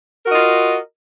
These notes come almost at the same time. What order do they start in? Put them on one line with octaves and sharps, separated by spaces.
A#4 F#4 D#5 F4